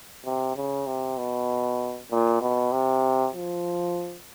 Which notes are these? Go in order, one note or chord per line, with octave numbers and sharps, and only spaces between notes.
C3
C#3
C3
B2
A#2
B2
C3
F3